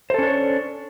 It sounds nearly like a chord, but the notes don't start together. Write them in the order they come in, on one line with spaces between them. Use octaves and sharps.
C5 A4 C#4 D4 C#5